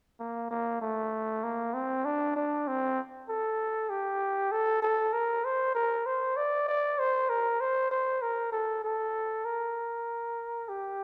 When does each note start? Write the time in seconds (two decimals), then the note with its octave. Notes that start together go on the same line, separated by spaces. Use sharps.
0.20 A#3
0.51 A#3
0.81 A3
1.44 A#3
1.74 C4
2.05 D4
2.36 D4
2.68 C4
3.29 A4
3.90 G4
4.52 A4
4.82 A4
5.13 A#4
5.45 C5
5.75 A#4
6.06 C5
6.37 D5
6.68 D5
6.99 C5
7.29 A#4
7.61 C5
7.91 C5
8.22 A#4
8.52 A4
8.84 A4
9.45 A#4
10.69 G4